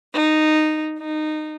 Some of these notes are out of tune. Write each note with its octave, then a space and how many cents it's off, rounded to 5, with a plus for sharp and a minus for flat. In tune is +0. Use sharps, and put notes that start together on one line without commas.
D#4 -10
D#4 -20